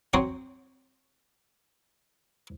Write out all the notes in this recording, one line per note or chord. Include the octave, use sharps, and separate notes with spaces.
F#3 C4 C5 C#5 D#6